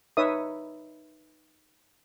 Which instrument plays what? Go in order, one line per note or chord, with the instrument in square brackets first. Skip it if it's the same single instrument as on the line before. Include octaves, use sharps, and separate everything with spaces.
[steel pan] D#4 B4 C#5 E5 D#6